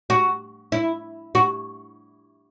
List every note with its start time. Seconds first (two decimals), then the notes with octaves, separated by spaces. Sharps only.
0.10 F#4
0.72 E4
1.35 F#4